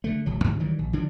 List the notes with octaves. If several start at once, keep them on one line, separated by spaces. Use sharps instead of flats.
D3 A3
D1 C#2 F#3
C#2 G#2 C3 F#3
D#3 E3 F#3 G3
A#1
D3 F3 F#3 D4